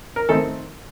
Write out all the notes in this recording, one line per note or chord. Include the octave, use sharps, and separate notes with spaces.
A#4
D#3 A3 C4 A4